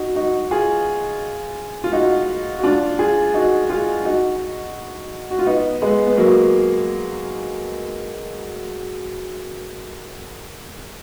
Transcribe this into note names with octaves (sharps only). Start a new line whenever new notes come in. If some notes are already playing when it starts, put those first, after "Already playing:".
Already playing: D#4 F#4
D#4 F#4
F4 G#4
F4
D#4 F#4
F#4
D4 F4
F4 G#4
D#4 F#4
F4 G#4
D#4 F#4
F#4
F4
B3 D#4
G#3 B3
B3
F#3 A#3